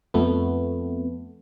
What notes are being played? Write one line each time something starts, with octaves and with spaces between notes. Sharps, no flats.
F2 A3 B3